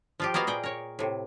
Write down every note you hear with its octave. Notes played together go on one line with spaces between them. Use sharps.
F3 F4 G4
A#3 B3 F#4 D#5 F5
A#2 G#4 G5
A#4 C#5
A2 C3